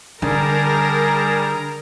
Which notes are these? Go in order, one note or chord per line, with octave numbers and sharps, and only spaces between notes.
D3 G3 G#4 A#4 A5 A#5